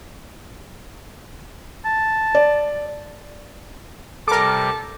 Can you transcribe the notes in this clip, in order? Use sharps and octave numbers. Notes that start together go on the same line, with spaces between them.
A5
D5
C3 G3 A4 A#4 D6